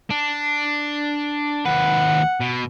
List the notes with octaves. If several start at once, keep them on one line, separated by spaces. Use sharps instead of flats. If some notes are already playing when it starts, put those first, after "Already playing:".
D4
D#2 B4 F#5
B2